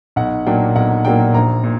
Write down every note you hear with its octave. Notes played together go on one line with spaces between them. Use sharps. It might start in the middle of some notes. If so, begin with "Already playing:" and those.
B1 F#5
A#2 F#3 A#3 D4 G5
B1 F#5
A#2 F#3 A#3 D4 G5
A#1 A#5
A#2